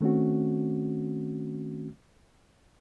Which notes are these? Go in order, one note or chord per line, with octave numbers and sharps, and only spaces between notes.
D#3 A3 C4 C#4 F#4